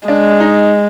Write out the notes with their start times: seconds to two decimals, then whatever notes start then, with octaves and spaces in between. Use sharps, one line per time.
0.08 G#3 D4
0.40 D#4